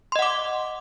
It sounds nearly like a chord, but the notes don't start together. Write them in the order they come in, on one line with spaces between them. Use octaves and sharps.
C6 D#5 F#5 D6